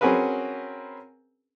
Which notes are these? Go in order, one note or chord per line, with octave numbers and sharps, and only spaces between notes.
C4 C#4 F#4 G#4 A#4 B4